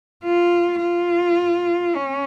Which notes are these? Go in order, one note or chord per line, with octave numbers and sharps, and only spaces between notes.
F4
F4
C#4